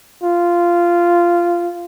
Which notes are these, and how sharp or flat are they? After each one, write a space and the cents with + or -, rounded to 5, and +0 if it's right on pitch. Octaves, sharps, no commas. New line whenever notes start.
F4 -10